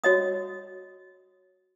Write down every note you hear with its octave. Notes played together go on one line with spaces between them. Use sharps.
F#4 C#5 D#5 D#6